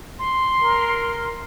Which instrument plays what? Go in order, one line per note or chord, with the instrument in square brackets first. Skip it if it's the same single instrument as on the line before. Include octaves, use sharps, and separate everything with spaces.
[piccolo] C6
[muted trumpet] A#4